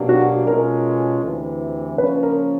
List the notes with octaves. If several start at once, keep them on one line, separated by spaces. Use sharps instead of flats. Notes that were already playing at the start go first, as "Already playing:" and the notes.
Already playing: B2 F#3 A#3 D4 G4
F#4
B2 G#3 C#4 F4 A4 A#4
D2 C3 E3
C#3 F3 A#3 C#4 B4
A#4